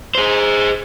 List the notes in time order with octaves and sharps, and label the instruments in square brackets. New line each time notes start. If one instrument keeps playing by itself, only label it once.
[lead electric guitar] G#4 C5